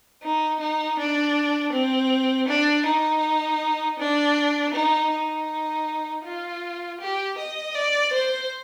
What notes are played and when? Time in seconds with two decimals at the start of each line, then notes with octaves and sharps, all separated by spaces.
0.23 D#4
0.60 D#4
0.98 D4
1.72 C4
2.48 D4
2.86 D#4
3.99 D4
4.74 D#4
5.11 D#4
6.24 F4
7.00 G4
7.38 D#5
7.74 D5
8.13 C5